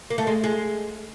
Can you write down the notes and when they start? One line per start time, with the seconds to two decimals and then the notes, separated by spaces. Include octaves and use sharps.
0.10 A#3
0.18 A3
0.27 G#3
0.44 G#3